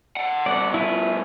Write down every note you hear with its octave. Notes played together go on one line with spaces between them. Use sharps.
D5 F#5
B2 G3 D5 F#5
E4 F4 B4